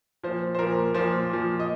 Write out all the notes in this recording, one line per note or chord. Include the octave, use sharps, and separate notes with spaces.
A#2 F3 C5
C5
A#2 F3 A#4
A#2 F3 C5
A#2 F3
D#5